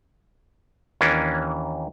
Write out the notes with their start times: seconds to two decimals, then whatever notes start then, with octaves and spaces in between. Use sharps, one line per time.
1.01 D#2 E3 A#3 C#4 D4